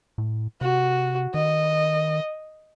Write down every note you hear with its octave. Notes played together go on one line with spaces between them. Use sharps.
A2
C3 F#4
D#3 D#5